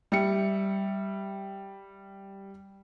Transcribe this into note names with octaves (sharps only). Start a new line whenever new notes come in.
G3 E5 C#7